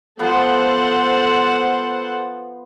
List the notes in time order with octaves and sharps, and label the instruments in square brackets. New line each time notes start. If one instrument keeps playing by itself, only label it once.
[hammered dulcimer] F3 B3 [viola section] A4 C5 F#5